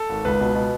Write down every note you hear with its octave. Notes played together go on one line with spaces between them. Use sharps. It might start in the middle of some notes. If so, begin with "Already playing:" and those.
Already playing: A4
G#1
C#2 B4
B2
B2